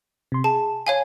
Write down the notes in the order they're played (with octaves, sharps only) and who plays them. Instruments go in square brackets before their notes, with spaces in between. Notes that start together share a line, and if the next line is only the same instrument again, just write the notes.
[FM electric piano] C3 C6
[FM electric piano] G#4 [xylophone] A5
[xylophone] C#5 F5 G#5